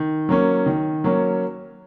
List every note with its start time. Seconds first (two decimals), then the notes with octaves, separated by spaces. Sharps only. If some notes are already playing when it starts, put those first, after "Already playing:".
Already playing: D#3
0.29 F#3 A#3 C#4
0.66 D#3
1.04 F#3 A#3 C#4